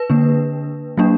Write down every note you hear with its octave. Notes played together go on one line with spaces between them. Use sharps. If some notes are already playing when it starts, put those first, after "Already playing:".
Already playing: B4
D3 A#3 D4
F#3 A#3 D4